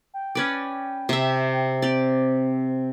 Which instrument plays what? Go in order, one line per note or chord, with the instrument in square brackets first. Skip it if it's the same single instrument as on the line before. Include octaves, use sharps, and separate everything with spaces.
[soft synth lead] G5
[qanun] C#4 B4 D5
C3 E5
[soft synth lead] C4 [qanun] G4 D5